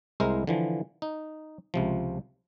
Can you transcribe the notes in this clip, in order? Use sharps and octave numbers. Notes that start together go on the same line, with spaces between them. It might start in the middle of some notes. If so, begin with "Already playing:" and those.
C2 G#3 E4 A#4 C5 A#5
D3 E3 F3
D#4
C#2 C3 F3